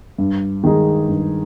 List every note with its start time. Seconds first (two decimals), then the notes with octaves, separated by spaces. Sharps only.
0.18 G2
0.64 D#3 G#3 D#4 G#4
1.09 G2